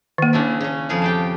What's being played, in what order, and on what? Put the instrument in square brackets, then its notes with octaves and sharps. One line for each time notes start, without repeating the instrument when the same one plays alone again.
[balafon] D#3 A#3
[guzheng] C#3 D4 E4
C#3 C#4
F2 G#4 F5
G4 G5 A5